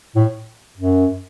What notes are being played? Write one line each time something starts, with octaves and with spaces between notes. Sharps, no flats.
A2
F#2